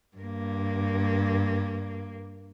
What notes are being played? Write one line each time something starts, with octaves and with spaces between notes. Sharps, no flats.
G2 A#3